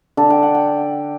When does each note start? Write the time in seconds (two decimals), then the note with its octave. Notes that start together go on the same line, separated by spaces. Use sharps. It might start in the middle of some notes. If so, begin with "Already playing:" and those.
0.17 D3 A5
0.30 G5
0.43 F#5
0.55 G5